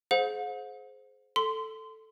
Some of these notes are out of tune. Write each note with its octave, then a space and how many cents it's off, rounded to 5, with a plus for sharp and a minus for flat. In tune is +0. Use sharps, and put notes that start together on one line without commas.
G#4 +35 C5 +0 F#5 -45
A4 +0 C6 -20